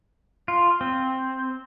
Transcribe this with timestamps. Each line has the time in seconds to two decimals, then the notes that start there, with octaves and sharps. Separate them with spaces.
0.48 F4
0.81 C4